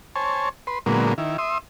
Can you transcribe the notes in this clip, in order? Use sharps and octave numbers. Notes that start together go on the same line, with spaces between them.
C5 C#5 G#5 A5
B4 C6
A#2 D3 F#3 G#3 A#3 B3
D#3 E4
E5 C6 D#6